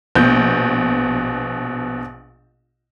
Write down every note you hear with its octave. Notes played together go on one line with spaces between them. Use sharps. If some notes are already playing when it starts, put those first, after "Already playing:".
A#1 B2 G6